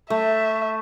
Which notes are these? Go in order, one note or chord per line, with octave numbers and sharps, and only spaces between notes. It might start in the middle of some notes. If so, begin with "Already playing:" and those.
A3 E5